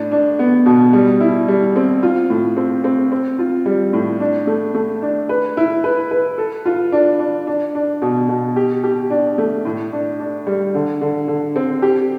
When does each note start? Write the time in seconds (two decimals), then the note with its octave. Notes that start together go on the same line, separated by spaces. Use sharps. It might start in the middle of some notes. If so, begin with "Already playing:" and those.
Already playing: A2 D4
0.12 D4
0.39 B3
0.66 B2
0.93 G3
1.20 E4
1.48 G3
1.76 C4
2.03 F4
2.30 A2
2.57 C4
2.84 C4
3.12 C4
3.39 F4
3.66 G3
3.93 A2
4.20 D4
4.47 A3
4.75 A3
5.02 D4
5.29 B4
5.57 E4
5.84 B4
6.11 B4
6.38 A4
6.66 F4
6.92 D4
7.19 D4
7.47 D4
7.75 D4
8.02 B2
8.29 B2
8.56 G4
8.84 G4
9.10 D4
9.38 A3
9.65 A2
9.93 D4
10.19 D4
10.47 G3
10.75 D3
11.01 D3
11.28 D3
11.56 C4
11.82 G4